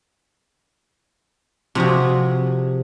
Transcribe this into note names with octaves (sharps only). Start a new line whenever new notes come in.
C3 F3 F#4 G#4